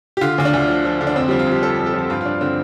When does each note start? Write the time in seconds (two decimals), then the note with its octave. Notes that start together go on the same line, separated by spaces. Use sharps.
0.17 G4
0.21 D3 F4
0.38 D2 F4
0.45 D4
0.54 D2
0.68 F3
0.85 F3
1.01 D3
1.07 D4
1.16 F2 C4
1.28 F3 G3
1.39 F4
1.47 F2
1.52 G4
1.63 F3 A4
1.79 F2
1.86 A4
1.94 F3
2.10 G2 F4
2.21 F4
2.25 G2 D4
2.41 D3 C4